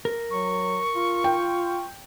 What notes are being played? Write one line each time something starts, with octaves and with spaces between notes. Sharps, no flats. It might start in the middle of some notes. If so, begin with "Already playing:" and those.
A#4
F#3 C#6
F4
G5